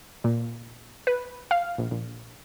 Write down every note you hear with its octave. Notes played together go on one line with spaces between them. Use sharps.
A#2
B4
F5
A#1
A#1